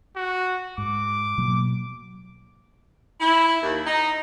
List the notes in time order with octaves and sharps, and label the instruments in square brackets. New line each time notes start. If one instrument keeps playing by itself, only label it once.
[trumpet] F#4
[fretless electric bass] G#2 [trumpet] D6
[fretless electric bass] B2 F#3 A#3
[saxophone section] E4
D#2
D#4